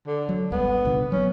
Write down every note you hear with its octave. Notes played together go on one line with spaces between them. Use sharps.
D3
F#3
G#1 C#2 G3 B3
C2 A#2 D3
F#3 A#3 B3 C#4